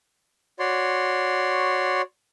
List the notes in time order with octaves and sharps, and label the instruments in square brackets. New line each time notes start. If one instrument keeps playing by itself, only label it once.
[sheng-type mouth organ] F#4 C#5 D5 C6